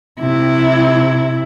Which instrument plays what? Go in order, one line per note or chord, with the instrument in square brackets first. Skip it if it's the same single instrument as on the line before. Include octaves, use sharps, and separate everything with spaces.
[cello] C3 E4